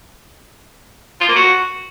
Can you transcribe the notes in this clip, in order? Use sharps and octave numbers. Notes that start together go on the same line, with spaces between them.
F4
A#3
F#4